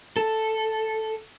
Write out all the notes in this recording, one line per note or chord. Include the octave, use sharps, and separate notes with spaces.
A4